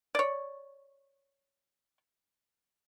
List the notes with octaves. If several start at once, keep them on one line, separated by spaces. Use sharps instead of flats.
C#5 D5